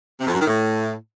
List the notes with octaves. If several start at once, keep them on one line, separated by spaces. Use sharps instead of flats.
C3
F2
F#2
D#3
A2